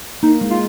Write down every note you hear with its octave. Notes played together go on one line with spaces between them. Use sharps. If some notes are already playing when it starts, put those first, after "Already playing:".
A#3 D#4
G#3
F4